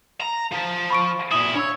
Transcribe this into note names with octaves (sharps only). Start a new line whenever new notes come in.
A#5
F3
B5 C#6 D7
A#2 E4 D#6
D4 C#5 E6